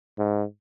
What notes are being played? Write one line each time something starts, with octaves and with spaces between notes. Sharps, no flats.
G#2